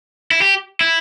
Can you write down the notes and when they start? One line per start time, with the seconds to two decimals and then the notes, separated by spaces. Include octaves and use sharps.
0.31 E4
0.42 G4
0.81 E4